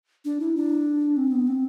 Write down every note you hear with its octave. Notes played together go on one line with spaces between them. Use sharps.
D4
E4
D4
C4
B3
C4